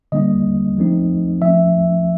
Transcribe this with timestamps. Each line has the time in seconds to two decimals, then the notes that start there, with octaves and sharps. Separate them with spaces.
0.12 D3 G3 A#3 D4 D#5
0.77 F3 A3 C4 D#4
1.42 F3 A3 C#4 E5